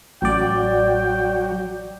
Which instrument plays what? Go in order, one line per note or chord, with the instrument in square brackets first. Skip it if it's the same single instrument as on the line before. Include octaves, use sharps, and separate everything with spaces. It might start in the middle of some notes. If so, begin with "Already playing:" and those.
[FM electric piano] A1 D5 [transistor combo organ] F#3 [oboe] G5